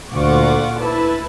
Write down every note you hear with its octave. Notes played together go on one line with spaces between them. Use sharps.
D2 A#2 F4 F#5 C#6 D6
E4 B4 A5